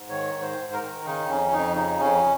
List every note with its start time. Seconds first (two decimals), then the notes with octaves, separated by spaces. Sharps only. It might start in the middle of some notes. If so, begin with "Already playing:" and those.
Already playing: G#2
0.10 D#3 C#5
0.34 G#2
0.42 C5
0.58 G#2
0.73 A#4
0.82 D#3
1.05 C#3 D#4
1.29 F2 C#4
1.52 F2 D#4
1.75 C#3 D#4
2.00 F2 C#4